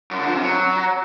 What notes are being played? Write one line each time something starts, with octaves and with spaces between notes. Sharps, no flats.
F#2
D3
F3
C3
F#3